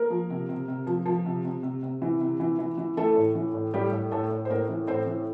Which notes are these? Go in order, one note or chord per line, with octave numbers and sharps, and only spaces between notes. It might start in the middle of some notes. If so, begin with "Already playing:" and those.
Already playing: A#3 A#4
F3
C3
C3
C3
F3
F3
C3
C3
C3
C3
E3
C3
E3
E3
E3
E3 A3 A4
A2
E3
A2
A2 G3 G4
A2
A2 A3 A4
A2
C5
A2 A#3 A#4
E3
A2 C4 C5
E3